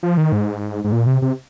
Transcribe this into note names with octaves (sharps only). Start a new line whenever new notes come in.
F3
D#3
G#2
G#2
A#2
C3
C3